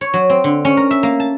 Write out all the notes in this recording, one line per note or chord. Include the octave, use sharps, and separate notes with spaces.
C#5
F#3
C4
D3
C#4
A#4
E5
A#3
A5